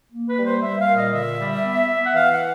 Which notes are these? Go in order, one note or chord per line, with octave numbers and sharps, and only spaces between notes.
A#3
B4
G3
C5
G3 E5
F5
A#2
D#5
D3 E5
G3
B3
B3
F#5
E3 F5
F#5